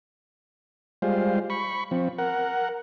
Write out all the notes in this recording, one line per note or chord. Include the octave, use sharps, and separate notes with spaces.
G3 G#3 F4 C5
B5 C#6
F3 C4
A#4 F#5